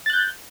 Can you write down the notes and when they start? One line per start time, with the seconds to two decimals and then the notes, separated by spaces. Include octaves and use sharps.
0.06 A6
0.10 F#6
0.13 G6